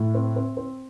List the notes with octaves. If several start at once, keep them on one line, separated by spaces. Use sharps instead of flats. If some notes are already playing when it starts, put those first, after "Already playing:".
Already playing: A2
C4
C4
C4